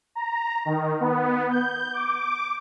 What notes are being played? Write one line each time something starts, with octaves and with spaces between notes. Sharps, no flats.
A#5
D#3
B3
G6
D6